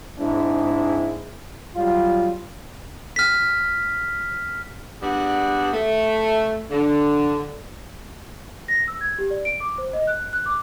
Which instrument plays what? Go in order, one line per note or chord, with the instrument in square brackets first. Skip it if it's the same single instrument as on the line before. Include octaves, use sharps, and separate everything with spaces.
[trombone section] G#2 G#3 C4 D4 E4
F#3 G3 F4
[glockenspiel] F6 B6
[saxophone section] G3 B3 D4 F#4 G#4
A3
D3
[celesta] A#6
E6
G#6
G4
D5
D7
D6
C5
D#5
F#6
F#6
D6